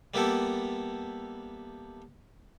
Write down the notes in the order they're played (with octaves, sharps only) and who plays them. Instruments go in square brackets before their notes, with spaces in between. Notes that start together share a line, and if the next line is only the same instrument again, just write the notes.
[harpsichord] G3 A#3 B3 E4 G4 A4